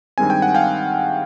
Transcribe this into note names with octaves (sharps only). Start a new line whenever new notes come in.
G2 D#3 G#3 C4 G#5
G5
F#5
F5 G5